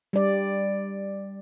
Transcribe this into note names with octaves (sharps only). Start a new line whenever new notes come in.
G3 D5